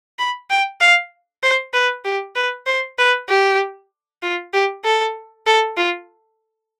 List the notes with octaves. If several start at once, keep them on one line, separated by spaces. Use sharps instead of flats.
B5
G5
F5
C5
B4
G4
B4
C5
B4
G4
F4
G4
A4
A4
F4